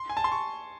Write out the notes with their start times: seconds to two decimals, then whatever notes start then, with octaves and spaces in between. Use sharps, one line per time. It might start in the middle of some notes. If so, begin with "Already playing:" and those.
Already playing: C6
0.10 G#5
0.17 A5
0.24 C6
0.32 C#6